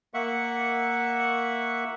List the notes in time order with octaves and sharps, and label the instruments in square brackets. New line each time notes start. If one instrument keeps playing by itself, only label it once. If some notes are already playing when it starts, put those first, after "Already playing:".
[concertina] A#3 E5 F#5 C#6